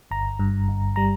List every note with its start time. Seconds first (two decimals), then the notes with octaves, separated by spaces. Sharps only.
0.11 G1 A#5
0.39 G2
0.68 G1
0.96 G3 A#5